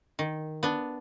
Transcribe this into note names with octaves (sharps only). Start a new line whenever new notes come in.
D#3
B3 D4